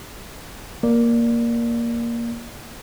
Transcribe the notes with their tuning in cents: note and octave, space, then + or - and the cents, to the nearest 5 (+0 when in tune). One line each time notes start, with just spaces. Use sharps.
A#3 +5 D5 +0